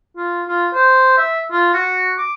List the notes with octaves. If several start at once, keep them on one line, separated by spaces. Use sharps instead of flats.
F4
F4
C5
E5
F4
F#4
D6